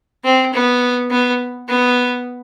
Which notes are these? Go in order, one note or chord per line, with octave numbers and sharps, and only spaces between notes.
C4
B3
B3
B3